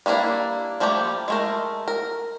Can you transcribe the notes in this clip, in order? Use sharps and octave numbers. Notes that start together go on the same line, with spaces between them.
G3 A#3 C#4 D4 E4
F3 G3 A3 A#3 G4
G#3 A3 A#4
A#4